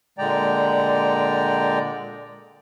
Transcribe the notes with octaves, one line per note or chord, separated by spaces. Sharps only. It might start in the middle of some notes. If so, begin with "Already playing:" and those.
A#2 D3 G#3 D5 G5 A#5